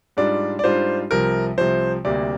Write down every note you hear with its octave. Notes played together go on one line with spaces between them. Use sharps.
G#2 G3 D4 F4 D5
D5
G#2 G3 D4 F4 C5
C2 C3 F3 A#4
C2 C3 F3 C5
D2 C3 G3 A#3 D5